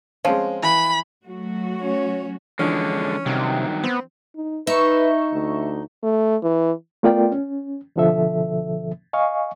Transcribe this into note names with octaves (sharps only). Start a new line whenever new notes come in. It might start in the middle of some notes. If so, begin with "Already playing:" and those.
F3 G#3 C4 C#4
E3 B5
F#3 A3 F#4
C#4 C#5
D3 E3 F3 G#3 C#4 D4
G2 C3 D#3 F#3
B3 C4
D#4
D#4 B4 E5 C#6
D2
A3
E3
A3 B3 F4 A#4 D5 G5
C#4
C2 B2 D3 F3 A4 E5
D#5 F5 G#5 C#6